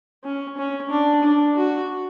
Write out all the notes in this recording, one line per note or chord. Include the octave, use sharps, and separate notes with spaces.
C#4
C#4
D4
D4
F#4